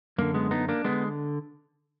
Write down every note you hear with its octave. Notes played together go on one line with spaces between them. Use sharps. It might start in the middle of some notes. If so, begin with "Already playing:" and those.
F#2 D3 A#3
G#3 B3
B3 D#4
A#3 D4
D3 G#3 B3